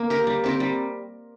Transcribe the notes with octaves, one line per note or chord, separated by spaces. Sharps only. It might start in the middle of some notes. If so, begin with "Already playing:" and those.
Already playing: A#3
G4 A#4
G3
C4 G4 A#4
G3